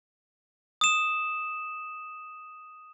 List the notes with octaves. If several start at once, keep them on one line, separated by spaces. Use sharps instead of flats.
D#6 E7